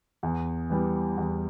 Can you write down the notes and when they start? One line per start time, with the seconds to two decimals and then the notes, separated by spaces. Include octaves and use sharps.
0.23 E2
0.70 E3 G3
1.17 E2